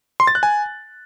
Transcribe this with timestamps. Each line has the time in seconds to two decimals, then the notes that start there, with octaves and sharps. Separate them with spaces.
0.20 C6
0.27 A6
0.35 F#6
0.43 G#5